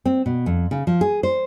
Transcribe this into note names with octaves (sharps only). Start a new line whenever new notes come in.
C4
B2
F2
C#3
F3
G#4
C5